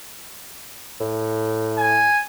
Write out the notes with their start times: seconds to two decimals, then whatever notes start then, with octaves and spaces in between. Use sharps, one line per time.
1.00 A2
1.78 G#5